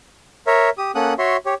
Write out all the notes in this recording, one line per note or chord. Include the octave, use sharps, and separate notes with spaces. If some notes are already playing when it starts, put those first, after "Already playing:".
A#4 C#5 E5
G4 D#6
A#3 C#4 A4 F#5 D#6 F#6
F#4 C#5 E5 C6
G4 C#5